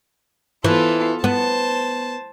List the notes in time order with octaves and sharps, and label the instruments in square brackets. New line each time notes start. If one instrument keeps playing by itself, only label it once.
[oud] E3 [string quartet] B3 F4 A4
[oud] B3 [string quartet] C5 A5